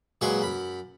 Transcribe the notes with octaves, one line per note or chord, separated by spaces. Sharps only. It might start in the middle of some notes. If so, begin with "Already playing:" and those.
A#2 F#3 G#3 B4 C6 C#6
F#2 B5